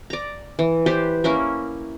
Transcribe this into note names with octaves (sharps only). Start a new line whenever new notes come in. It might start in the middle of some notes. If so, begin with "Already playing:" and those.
D5 A#5
E3
G4 B4 C5 D5
A#3 C#4 E4 A#4